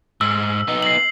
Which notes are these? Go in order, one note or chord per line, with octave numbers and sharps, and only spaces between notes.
G#2 E6
B3 D#4
C7 F#7